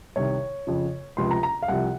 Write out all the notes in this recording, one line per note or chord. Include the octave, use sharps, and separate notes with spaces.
C2 C3 D#3 C#5
F2 C#3 F3
C#2 C3 F3 C6
A#5
A#5
F5
C2 C3 F3 F#5